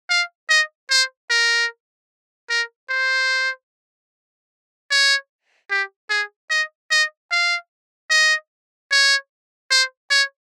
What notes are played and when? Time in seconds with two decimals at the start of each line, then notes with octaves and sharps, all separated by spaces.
0.10 F5
0.50 D#5
0.91 C5
1.30 A#4
2.50 A#4
2.90 C5
4.91 C#5
5.71 G4
6.10 G#4
6.50 D#5
6.91 D#5
7.31 F5
8.10 D#5
8.91 C#5
9.71 C5
10.11 C#5